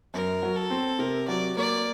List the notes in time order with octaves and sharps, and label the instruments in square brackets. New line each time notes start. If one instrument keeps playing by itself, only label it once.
[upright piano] F#2 [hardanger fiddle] A#4
[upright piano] F#3
[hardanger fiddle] A4
[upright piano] C4
[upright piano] C3 [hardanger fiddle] A#4
[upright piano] F#3 [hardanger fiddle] D5
[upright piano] A#3 [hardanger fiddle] D5